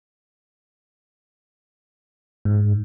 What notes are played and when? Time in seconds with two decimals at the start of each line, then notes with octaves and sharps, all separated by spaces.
2.45 G#2